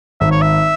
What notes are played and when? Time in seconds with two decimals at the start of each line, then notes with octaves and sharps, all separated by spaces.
0.21 G#1 E5
0.31 C#5
0.42 E5